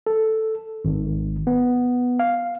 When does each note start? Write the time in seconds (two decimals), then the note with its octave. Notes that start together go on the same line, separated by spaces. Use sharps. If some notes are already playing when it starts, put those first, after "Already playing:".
0.07 A4
0.85 G#1
1.47 B3
2.19 F5